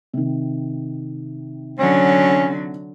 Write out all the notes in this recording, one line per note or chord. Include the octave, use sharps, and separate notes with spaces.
C3 D#3
D3 F#3 C#4